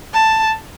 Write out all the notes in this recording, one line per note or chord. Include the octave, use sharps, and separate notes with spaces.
A5